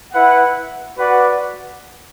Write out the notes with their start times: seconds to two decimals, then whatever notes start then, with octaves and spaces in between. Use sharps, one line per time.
0.14 E4 B4 F#5
0.98 F#4 B4 D5 F#5